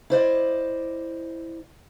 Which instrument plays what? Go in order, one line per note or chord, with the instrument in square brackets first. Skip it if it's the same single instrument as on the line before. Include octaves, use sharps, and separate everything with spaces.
[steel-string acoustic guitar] E4 C5 D5 D#5